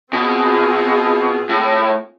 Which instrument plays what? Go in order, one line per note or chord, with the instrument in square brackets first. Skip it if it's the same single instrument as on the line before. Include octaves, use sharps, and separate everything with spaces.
[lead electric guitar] B2 [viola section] C4 F4 G#4
[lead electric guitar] A2